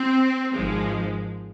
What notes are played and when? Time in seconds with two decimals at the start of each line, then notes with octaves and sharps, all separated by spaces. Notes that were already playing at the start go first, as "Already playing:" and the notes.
Already playing: C4
0.54 G#1 G#2 F3 G#3